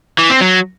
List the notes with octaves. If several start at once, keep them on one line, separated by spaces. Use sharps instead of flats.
E3
C4
F#3